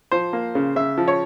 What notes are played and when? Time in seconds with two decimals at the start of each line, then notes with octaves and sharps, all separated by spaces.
0.11 F3 C5
0.33 A#3
0.55 C#3
0.76 C#3 E5
0.98 F3
1.08 C#5